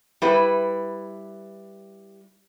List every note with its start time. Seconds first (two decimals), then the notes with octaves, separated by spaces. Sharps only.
0.22 G3 E4 B4